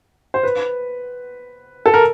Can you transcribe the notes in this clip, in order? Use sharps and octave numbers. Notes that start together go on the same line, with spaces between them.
C5
B4
A4
A#4